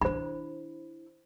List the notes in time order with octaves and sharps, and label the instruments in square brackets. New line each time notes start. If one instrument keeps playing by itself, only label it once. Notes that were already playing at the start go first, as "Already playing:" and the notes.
[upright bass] D4 E4 [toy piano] C5 B5